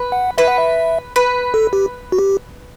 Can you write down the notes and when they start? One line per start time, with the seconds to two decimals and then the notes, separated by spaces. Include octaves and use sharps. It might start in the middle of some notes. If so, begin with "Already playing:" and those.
Already playing: B4
0.12 F#5
0.38 B4 E5
0.48 F#5
0.58 E5
1.16 B4
1.54 A4
1.73 G4
2.12 F#4
2.18 G4